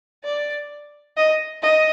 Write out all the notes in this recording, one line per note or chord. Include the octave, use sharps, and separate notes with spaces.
D5
D#5
D#5